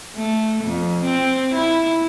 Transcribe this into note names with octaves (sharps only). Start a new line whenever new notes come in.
A3
F2
C4
E4